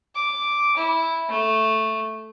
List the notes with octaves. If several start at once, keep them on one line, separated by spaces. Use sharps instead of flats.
D6
E4
A3